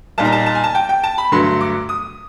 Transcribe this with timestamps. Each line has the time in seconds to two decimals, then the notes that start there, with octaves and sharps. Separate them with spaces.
0.18 A#2 G3 A#3 D#4 A5
0.25 A#5
0.32 A5
0.46 A5
0.55 G#5
0.64 A5
0.75 G5
0.89 G5
1.04 A5
1.18 B5
1.32 G2 D3 F#3 A3 C6
1.61 D6
1.89 D#6